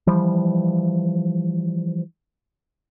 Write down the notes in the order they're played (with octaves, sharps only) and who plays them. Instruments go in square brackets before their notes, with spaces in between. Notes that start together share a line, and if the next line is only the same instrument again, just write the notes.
[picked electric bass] E3 F3 G3